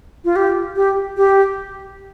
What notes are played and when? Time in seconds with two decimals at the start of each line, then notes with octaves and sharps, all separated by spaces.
0.25 F4
0.36 G4
0.76 G4
1.17 G4